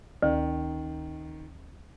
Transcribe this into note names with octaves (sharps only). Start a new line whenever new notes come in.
D2 D#3